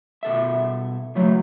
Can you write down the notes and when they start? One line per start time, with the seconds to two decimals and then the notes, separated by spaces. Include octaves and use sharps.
0.23 B2 A4 E5
1.15 C#3 E3 F#3 A3